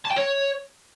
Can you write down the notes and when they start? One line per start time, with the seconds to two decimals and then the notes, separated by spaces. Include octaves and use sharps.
0.05 A5
0.11 G5
0.16 C#5